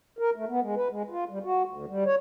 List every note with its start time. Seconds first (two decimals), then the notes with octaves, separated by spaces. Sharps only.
0.19 A#4
0.36 A3
0.49 B3
0.62 G#3
0.76 B4
0.89 G#3
1.10 F4
1.29 G3
1.44 F#4
1.65 D2
1.88 G3
2.06 C#5